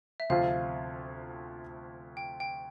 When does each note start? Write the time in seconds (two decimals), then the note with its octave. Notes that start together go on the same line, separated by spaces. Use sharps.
0.20 E5
0.30 D2 C3 F3 C4 F4 F5
2.17 G5
2.40 G5